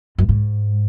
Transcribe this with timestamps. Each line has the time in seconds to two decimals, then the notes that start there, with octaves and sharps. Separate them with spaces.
0.18 F#2
0.29 G#2